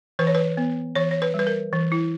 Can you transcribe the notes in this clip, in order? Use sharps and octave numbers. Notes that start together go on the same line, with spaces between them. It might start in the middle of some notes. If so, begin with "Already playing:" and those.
E3 B4
C#5
B4
B3
E3 C#5
C#5
B4
G3
B4
A#4
E3
E4